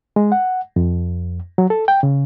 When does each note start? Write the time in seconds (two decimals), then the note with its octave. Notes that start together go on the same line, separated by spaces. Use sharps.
0.16 G#3
0.32 F#5
0.76 F2
1.58 F#3
1.70 A4
1.88 G5
2.03 C#3